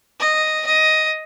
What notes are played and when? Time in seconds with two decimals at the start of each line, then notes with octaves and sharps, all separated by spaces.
0.20 D#5
0.66 D#5